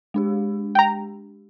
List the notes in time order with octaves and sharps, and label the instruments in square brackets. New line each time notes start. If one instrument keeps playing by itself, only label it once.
[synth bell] G#3 D4 G4
[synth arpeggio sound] G5 A#5